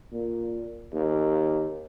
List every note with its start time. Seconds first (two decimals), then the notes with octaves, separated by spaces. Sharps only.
0.13 A#2
0.93 D#2